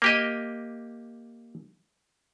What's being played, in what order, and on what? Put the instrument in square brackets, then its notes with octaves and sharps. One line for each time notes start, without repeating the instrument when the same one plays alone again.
[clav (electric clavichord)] A#3 G4 D#5